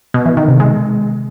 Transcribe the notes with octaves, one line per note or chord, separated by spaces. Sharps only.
B2
E3
D#3
C3
G#3